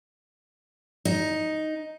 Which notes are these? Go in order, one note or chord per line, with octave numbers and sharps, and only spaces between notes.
D#4